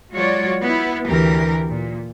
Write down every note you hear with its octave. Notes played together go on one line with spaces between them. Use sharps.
F#3 G#3 F4 F#4 C#5 D5
B3 E4
D2 E3 G4 A#4
A#2